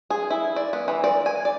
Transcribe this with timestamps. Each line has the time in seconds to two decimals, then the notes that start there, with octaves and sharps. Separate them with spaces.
0.10 G#4
0.30 E4
0.56 D5
0.73 B3
0.88 E3
1.04 D5
1.26 G#5
1.45 D5